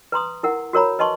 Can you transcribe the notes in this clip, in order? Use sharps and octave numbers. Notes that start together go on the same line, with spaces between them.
B4 A#5 C6 D#6
E4 A#4 F#5
F#4 A#4 C#5 A#5 B5
B4 D#5 A5 C6 C#6